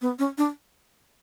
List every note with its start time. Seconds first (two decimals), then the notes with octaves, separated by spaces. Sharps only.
0.01 B3
0.19 C#4
0.38 D4